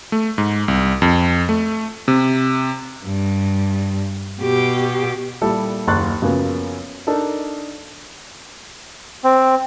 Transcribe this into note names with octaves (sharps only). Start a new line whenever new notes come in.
A3
G#2
C2
F2
A3
C3
G2
B2 G4
A#2 G3 E4 A4
F#1 D#2 C6 C#6 F#6 A6
F#2 C#3 F3 F#3 A#3 B3
D4 D#4 A4 A#4
C4